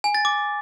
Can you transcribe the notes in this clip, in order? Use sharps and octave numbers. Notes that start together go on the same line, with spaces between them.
G#5
A6
D6